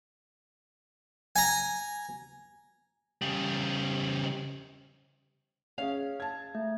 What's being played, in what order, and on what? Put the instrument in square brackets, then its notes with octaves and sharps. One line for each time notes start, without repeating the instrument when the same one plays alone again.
[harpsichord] G#5 A#5
[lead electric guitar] C#3 G3
[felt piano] C#4 G#4 [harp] F5
[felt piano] A5 G#6
[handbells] A3